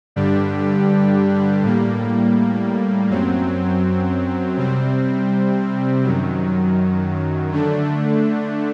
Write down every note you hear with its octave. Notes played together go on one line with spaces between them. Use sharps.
G2 D3 G3 D4 G4
A2 G3 A#3
F#2 F#3 C4
C3 G3 C4
F#2 D#3 F#3
D3 A3 D4